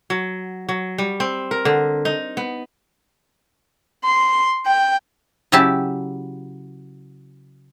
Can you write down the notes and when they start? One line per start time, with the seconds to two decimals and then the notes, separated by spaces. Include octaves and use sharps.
0.10 F#3
0.69 F#3
0.98 G3
1.20 C4
1.51 A#4
1.65 D3
2.05 D#4
2.37 B3
4.03 C6
4.66 G5
5.52 C#3 F#3 E4 G4 A5